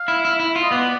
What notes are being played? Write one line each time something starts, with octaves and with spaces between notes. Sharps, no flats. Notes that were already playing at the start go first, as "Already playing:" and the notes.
Already playing: F5
E4
E4
E4
F4
D#5
B3 D5